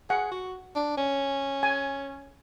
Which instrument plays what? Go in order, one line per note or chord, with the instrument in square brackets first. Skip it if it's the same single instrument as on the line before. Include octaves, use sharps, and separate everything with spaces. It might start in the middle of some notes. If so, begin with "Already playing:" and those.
[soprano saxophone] G#4 [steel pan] F#5
[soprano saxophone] F#4
D4
C#4
[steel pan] G#5